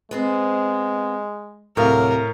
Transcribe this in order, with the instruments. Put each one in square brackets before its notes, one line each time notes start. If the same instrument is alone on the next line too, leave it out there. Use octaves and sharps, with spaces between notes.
[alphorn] G#3 [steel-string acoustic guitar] B3 C4 C5
[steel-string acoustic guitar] D2 C3 [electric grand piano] A2 F5 F6 [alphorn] F#3 [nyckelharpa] A#4